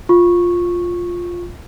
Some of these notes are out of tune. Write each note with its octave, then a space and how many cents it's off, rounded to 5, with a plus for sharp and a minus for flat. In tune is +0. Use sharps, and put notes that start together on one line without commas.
F4 +5 C#6 -10